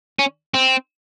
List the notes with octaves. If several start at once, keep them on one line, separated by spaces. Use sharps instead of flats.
C#4
C4